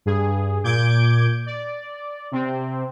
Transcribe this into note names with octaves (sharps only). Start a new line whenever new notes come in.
G2 G#4
A#2 D6 G6 G#6 D7
D5
C3 C4